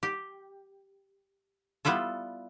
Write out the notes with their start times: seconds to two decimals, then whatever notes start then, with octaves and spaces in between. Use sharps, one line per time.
0.03 G4
1.85 G3 B3 E4 F4 A4